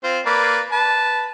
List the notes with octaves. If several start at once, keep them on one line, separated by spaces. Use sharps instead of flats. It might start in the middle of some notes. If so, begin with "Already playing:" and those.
C4 F4 C5
A#3 B4 D5
B4 A5